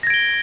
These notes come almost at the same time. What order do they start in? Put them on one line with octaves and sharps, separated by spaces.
A#6 G#6 D7 G7